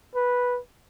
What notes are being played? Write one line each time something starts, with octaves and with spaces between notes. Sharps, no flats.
B4